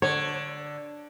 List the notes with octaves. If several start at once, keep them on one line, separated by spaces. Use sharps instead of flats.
D3 C#5